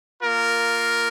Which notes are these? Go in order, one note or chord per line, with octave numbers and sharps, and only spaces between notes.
A#3 F4 A#4